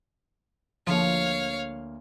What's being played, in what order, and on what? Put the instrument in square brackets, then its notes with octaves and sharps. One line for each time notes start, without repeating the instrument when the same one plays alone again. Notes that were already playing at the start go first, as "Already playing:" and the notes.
[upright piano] D2 A#3 [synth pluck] F3 [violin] C#5 F5